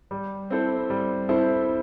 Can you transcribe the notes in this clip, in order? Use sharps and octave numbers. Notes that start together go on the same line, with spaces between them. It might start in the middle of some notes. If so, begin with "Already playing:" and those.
G3
C4 E4 A4 C5
G3
C4 E4 A4 C5